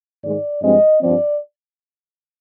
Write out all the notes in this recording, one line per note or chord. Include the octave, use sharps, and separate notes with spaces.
G#2 D#3 G#3 D5
G2 F3 G#3 C4 D#5
G2 F3 C4 D5